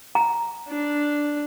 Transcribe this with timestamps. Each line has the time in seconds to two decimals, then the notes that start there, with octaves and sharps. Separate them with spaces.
0.15 A#5
0.69 D4